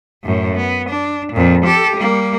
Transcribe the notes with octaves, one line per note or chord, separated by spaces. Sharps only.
F#2 A2
B3
D4
F2 A#2
G4 A4
G3 A#3